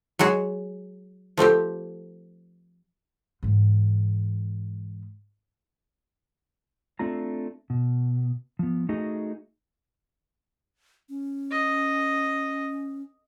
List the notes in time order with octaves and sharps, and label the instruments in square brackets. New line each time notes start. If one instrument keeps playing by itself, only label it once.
[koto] F#3 G#3 F#4 G#4
F3 A3 C4 G4
[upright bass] G#2 E3
[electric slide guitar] A3 C4 D4 F4 A#5
B2
F3 B3
A3 D#4 F#4 G#4 D#5
[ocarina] C#4
[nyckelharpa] D#5